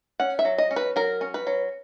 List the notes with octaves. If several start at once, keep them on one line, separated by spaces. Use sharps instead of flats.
C#4 F#5
E5
F#3
D#5
C#4
B4
F#3 A#4
C#4
B4
F#3